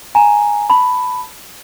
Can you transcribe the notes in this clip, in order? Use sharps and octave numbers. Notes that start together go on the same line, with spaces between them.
G#5 A#5
A5 B5